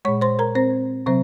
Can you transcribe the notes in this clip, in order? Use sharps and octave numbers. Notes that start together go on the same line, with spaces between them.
A#2 G#3 C#5 C#6
C5 C6
A#4 A#5
C4 C5
C3 F#3 C4 C5